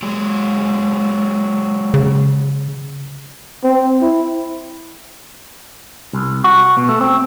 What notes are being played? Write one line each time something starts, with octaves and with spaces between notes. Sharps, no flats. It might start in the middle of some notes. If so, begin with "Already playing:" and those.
F#3 G#3
C#3
C4
E4
C2
F#4
B2
A3
C4